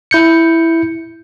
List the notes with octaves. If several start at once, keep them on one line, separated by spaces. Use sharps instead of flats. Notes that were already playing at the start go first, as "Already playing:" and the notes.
E4 G6 C#7